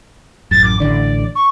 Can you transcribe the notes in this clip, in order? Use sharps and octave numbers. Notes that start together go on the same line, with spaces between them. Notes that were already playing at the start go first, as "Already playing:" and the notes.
A1 F#2 A6
D6
A1 D3 D5
C#6